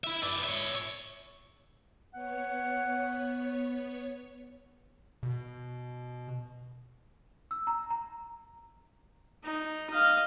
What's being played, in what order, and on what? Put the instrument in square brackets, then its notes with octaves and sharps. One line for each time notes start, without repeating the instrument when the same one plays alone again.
[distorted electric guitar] E4 E5
B4 D5
C#5 E5
[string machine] B3 C#5 [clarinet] F#5
[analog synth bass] B2
[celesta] E6
A#5
A#5
[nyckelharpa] D#4
D#5 F5